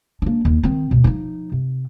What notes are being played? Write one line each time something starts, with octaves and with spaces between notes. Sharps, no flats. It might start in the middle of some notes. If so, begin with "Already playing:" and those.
A#3 D4
D#2
D#3 C4
D2 B2
F3 D#4
C3